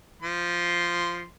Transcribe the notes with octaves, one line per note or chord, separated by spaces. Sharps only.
F3 C6